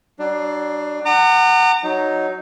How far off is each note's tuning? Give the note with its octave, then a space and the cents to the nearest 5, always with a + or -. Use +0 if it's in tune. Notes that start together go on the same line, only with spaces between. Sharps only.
F#3 +45 D4 +20
F#5 +10 A#5 -30 D6 +45
F#3 +0 D#4 +0